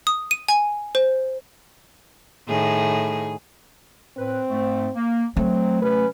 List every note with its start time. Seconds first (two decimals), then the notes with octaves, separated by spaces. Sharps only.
0.07 D#6
0.31 D#7
0.48 G#5
0.95 C5
2.48 A2 D#3 G#4
4.17 A2 C4 B4
4.50 G#2 A3
4.95 A#3
5.37 F#3 A3 C4
5.82 C3 F#3 C#4 B4